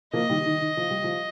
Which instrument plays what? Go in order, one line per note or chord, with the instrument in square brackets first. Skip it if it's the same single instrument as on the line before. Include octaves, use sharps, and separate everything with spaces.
[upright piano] F3 A#3 [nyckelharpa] D#5
[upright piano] D#3 G3
D#3
D#3
F3
G3
F3